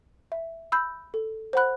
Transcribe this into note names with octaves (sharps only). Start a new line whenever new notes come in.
E5
B5 E6 G6
A4
C5 F#5 B5 F#6